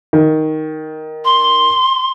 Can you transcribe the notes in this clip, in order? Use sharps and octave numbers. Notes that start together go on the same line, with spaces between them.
D#3
C6